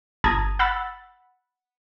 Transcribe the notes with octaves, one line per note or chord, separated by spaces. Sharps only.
G1 A5 A#5 D#6 G#6
F#5 B5 E6 A6